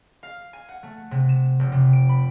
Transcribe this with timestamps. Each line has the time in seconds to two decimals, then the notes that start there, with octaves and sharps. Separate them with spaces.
0.23 F5
0.53 G#5
0.69 F#5
0.83 A3
1.11 C3
1.29 E7
1.59 F1
1.72 C3
1.93 D7
2.09 B5